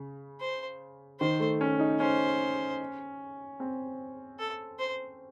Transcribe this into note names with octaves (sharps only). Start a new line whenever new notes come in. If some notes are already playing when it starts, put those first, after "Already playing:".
Already playing: C#3
C5
D#3 C5
A3
C#4
D#4
C#4 C5
C4
A4
C5